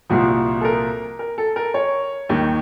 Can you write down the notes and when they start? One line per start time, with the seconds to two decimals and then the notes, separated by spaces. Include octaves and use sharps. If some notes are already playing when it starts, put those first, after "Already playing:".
0.10 C2 A#2 F3 F#4
0.61 A4
0.65 A#4
1.19 A#4
1.38 A4
1.56 A#4
1.74 C#5
2.29 D#2 D#3